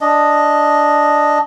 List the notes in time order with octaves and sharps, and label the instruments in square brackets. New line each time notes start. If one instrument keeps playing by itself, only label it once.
[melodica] D4 D#5